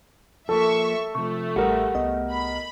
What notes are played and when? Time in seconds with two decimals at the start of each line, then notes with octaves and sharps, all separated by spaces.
0.49 F3 A#3 A4 E5 C#6
1.15 C3 F3 A3 C#6
1.56 A1 G3 G#4 A#4 F5 F#5
1.95 C2 B3 D#5
2.32 B5